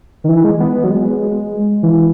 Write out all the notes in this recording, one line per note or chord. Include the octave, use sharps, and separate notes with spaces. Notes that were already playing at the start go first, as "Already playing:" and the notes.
D#3
E3
G#3
B3
F#3
G#3
E3